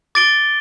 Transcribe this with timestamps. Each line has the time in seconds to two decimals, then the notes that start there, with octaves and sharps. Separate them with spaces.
0.15 D6 A6 D7 G7